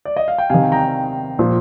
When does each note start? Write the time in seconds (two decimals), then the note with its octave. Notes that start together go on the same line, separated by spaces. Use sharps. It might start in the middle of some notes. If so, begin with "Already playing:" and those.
0.05 D5
0.16 D#5
0.28 F5
0.38 G5
0.50 C3 D#3 F5 G#5
0.72 G5 A#5
1.39 A#2 F3